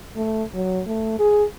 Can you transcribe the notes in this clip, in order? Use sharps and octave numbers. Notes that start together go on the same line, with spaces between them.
A3
F#3
A3
G#4